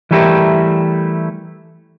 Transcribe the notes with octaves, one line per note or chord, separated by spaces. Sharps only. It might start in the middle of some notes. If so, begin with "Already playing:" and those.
E3 G3 A3 E4 G4 A#4